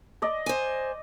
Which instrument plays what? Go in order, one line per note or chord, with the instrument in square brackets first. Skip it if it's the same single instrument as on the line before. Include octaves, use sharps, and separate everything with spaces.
[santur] D5 D#5
[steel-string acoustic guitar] C5 G#5